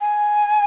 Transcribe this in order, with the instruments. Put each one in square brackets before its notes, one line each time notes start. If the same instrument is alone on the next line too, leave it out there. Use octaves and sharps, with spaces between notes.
[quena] G#5